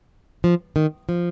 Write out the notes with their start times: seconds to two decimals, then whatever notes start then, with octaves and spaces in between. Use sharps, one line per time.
0.44 F3
0.76 D#3
1.09 F3